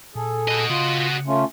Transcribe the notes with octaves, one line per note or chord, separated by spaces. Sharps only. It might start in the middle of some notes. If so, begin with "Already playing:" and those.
A#2 G#4 A4
F#4 D#5
C#3 F4
A3 C#4 F4